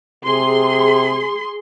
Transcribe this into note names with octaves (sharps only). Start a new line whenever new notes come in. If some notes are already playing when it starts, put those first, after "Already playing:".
C3 G#4 C6